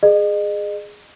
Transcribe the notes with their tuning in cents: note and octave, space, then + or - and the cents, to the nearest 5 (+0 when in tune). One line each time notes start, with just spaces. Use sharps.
G#4 +0 D#5 -35